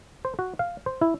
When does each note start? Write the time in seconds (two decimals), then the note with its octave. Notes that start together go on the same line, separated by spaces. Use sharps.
0.25 C5
0.39 F#4
0.59 F5
0.86 C5
1.01 E4